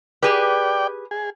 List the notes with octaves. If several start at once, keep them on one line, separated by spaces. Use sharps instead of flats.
G4 G#4 B4 D5 G5
G#4